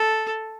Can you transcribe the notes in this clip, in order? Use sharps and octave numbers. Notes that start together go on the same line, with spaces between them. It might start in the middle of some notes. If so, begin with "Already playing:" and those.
Already playing: A4